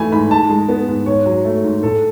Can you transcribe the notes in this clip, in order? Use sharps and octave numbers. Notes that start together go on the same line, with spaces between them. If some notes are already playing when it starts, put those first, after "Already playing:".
Already playing: G#2 E3 A3 G#5 B5
G#2 B5
G#2 A5
G#3
B3
G#2
G#2 C#5
F#3
A3
G#2
A2 A4